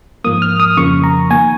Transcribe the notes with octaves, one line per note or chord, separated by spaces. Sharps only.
G#2 F3 A#3 D#6
F6
D#6
F2 C#3 F3 A#3 C#6
A#5
D#3 A#3 G#5